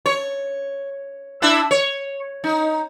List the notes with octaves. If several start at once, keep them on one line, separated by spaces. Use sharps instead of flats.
C#5
D4 E4 E5
C#5
D#4